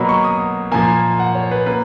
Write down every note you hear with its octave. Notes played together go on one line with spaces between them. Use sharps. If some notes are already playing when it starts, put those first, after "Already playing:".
Already playing: B2 F#3 A#3 A#5 B5
C#6
D#6
A#2 F3 A#3 G#5
F#5
C#5
B4
A#3 B4